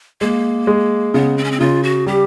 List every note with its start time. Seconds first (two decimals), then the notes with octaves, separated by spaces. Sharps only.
0.21 G#3 A#3
0.67 G#3
1.14 C#3 B3
1.38 C4
1.44 C#4
1.52 C4
1.60 C#3 F4
1.83 F#4
2.07 G3 G4